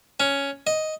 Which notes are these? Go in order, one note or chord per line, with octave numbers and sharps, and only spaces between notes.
C#4
D#5